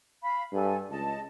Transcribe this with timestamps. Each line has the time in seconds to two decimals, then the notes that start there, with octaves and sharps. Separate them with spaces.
0.22 F5 B5
0.53 G2 A4 G#5
0.90 C#2 D#5 A5